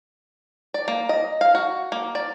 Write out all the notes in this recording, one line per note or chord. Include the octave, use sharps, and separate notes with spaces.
D5
A#3
D#5
F5
F#4
A#3
D5